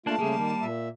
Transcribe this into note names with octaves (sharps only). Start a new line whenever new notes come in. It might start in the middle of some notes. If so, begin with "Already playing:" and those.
A3 A#3 D4 F4 A5
C#3 G3 A3 A#3 G#4
D#3
A#2 E5